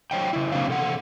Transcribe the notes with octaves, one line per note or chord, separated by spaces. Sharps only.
F#3 C5 C#5 D#5 G5
C#3 E4
F#3 A#3 C4 D4 C5 F5
C3 A4 F#5